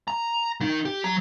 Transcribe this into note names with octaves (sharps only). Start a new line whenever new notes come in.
A#5
D#3 D#4
G4
F#3 A#5